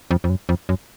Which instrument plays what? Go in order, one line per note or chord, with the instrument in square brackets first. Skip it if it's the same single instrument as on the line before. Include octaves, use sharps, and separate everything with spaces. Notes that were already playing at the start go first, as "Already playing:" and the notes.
[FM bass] F2
F2
F#2
F2
F#2